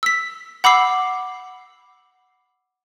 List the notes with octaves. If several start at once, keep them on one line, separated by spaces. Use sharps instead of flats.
E6 B6
F#5 B5 D6 E6 C7